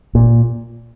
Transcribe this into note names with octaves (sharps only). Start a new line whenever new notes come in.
A#2